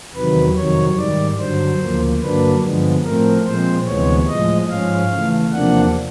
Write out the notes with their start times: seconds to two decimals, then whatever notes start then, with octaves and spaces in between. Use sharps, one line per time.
0.14 E2 C3 D#3 F#3 B4
0.55 F2 C3 D#3 F#3 C#5
0.97 G#2 D#3 G3 D5
1.39 G2 D3 F#3 C5
1.80 D2 C#3 F3 A#3
2.22 G2 D3 F#3 A#3 D4 B4
2.62 G2 D3 F3 G#3 B3
3.04 A2 F3 A3 C4 A#4
3.45 A#2 F3 G#3 C4 C5
3.87 D2 C3 E3 G#3 B3 C#5
4.29 A2 F3 G#3 D#5
4.69 G#2 F3 G#3 C#4 F5
5.11 C#3 E3 A3
5.52 E2 C3 F3 A#3 D4 F#5